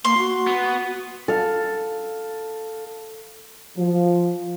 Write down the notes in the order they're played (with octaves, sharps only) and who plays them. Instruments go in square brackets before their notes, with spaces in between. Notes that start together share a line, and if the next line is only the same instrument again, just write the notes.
[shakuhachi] A#3 [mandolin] C6
[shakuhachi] F#4
[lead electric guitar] B3
[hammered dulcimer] A4 F5
[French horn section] F3